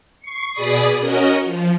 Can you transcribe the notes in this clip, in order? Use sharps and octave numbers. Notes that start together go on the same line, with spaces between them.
C#6 C7 C#7
B2 G#4 D5 B5 D#6
C#4 F#4 A#4 D#5
F3